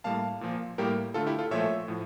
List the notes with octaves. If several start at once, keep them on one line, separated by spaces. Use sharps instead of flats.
A2 G3 A#3 F5 A5
A#2 F3 A#3
A2 G3 A#3 G4 A#4
D3 A3 F4 A4
E4 G4
F4 A4
A#2 F3 A3 C#5 E5
A2 F3